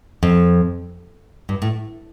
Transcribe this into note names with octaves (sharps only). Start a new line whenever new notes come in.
F2
G2
A2